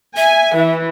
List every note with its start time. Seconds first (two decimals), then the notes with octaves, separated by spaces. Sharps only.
0.17 E5 G#5
0.56 E3